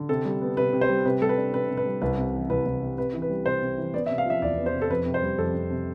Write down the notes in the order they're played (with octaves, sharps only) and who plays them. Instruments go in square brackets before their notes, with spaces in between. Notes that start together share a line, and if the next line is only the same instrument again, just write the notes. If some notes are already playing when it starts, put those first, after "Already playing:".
Already playing: [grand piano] D3
C3 A4
G3
B3
C3 B4
C3
C5
G3
C3 B4
G3 A4
B4
D4
C3 B4
C3
B4
G3
C2 B4
C3
E3
C2 B4
C2
C3
C3 B4
E3
B4
G3
C3 C5
C3
E3
B3 D5
E5
C3
F5
F3 E5
E2 D5
B3
C5
C3
A4
F2 B4
C3
C5
G3
F2 A4
F2
C3